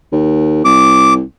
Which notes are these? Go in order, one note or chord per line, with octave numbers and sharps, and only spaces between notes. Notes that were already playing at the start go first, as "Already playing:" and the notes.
D#2
C2 D6